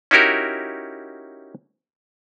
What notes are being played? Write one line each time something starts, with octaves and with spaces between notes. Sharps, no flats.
C#4 D#4 E4 F#4 G4 A#4